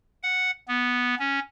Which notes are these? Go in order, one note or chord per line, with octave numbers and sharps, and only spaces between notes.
F#5
B3
C#4